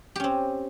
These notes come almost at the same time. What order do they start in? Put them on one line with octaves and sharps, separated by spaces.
G4 C#4 C4